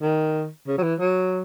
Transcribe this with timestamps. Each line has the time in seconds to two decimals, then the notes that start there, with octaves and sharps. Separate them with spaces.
0.02 D#3
0.67 C#3
0.78 F#3
0.83 E3
1.00 F#3